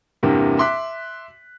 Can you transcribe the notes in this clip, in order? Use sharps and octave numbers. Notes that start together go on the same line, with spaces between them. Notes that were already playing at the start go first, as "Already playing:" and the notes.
E2 G2 C3 A#3
E5 C6 D6 F#6 B6